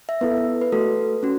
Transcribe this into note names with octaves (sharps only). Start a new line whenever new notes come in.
E5
B3 E4 A4 B4
B4
A3 F#4 A4
C#4 F#4